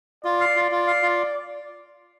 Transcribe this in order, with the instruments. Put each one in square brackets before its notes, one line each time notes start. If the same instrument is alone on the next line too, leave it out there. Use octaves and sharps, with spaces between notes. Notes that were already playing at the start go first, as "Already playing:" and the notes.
[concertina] F4 [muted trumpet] D5
[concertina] F5
F4
F4
F5
F4